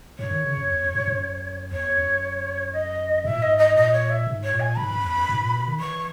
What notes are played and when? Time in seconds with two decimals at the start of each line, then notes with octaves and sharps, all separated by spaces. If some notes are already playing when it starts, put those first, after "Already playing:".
0.19 F#2 C#5
0.31 D#3
0.44 C#3
0.57 F#2
0.70 E2
0.82 F#2
0.95 F#2
1.07 F#2
1.71 E2 C#5
1.96 F#2
2.73 D#5
3.24 G#2 E5
3.34 A#2
3.42 G#2 D#5
3.58 D#5
3.76 A#2 D#5
3.93 C#5
4.09 E5
4.27 G#2
4.44 C#5
4.52 A#2
4.60 G#5
4.77 G#2 B5
4.91 F#2
5.04 E2
5.15 F#2
5.29 G#2
5.42 A#2
5.54 B2
5.67 D#3
5.79 E3 C#6